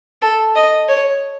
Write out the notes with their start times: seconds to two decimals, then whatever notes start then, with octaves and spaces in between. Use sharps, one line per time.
0.22 A4
0.55 D#5
0.88 C#5